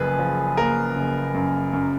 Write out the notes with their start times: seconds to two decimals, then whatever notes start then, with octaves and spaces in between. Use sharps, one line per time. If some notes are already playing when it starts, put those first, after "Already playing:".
Already playing: F#1 F#2 F3 G#4 B4
0.19 F3
0.57 A#3 A#4
0.96 F#1
1.34 F#2
1.73 F#2